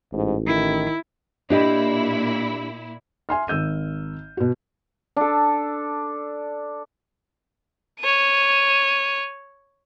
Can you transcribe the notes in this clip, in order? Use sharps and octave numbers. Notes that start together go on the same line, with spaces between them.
A1 G#2
D#3 E4
A#2 D4 E4 G4 D#5
E5 G#5 C6 F6
G#1 E6 G6 D#7
B2 F#4
D4 A4
C#5 D#7